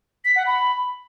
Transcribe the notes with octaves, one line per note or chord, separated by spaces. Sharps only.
B6
F#5
B5